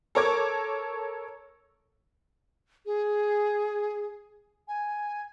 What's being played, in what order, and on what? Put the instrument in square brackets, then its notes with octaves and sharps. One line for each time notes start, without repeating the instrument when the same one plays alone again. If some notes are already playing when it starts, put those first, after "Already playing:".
[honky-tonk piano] A4 A#4 C#5 C#6 D6 G#6
[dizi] G#4
G#5